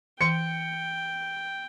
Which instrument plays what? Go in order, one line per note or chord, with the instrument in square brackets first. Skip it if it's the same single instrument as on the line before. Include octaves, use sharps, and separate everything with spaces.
[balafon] E3 [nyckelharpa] G5 [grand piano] C#7